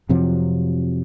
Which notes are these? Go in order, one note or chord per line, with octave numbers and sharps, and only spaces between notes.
F2 C3 F3 F#3